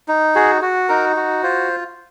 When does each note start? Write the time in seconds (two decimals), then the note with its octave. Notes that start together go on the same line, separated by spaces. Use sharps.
0.08 D#4
0.35 F#4 G#4
0.62 F#4
0.89 D#4 A#4
1.16 F#4
1.43 F4 C5